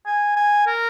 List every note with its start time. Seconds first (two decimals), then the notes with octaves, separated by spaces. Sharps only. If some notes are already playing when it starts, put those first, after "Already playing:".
0.06 G#5
0.36 G#5
0.67 A#4